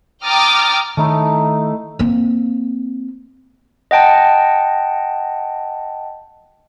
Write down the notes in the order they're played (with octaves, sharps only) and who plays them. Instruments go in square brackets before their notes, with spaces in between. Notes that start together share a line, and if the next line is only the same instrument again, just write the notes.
[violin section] G5 A#5 D6 D#6 F6 A6
[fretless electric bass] D#3 [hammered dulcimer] A3 D#4 E4
[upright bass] A#3 C4
[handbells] D#5 F#5 G5 A5